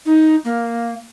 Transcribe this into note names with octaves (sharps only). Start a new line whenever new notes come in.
D#4
A#3